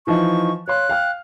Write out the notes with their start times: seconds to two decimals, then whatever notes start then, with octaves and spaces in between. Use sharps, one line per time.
0.07 E3 F3 D#4 C#6
0.68 C#5 F5 C6 F#6
0.89 F5 G5 F6